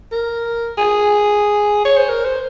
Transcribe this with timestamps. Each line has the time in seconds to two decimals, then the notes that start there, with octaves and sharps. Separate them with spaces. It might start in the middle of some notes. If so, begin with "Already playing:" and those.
0.12 A#4
0.78 G#4
1.85 C#5
1.97 C5
2.09 A#4
2.25 C5